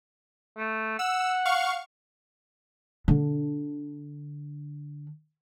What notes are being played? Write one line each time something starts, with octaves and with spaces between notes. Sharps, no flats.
A3
F#5 E6
F5 C#6
D3 D4